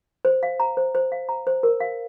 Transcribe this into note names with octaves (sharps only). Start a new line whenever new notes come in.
C5
F5
A#5
C5
C5
F5
A#5
C5
A#4
F5